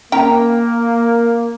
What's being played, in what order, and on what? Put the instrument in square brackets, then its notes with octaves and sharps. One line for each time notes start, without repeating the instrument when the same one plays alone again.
[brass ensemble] A#3 [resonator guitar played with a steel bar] C#4 A#5 [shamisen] G5